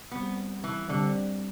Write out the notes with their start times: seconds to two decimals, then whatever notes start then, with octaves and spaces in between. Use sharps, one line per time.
0.11 G3 B3 C4 G4
0.64 E3
0.89 D3 G3 C4 G4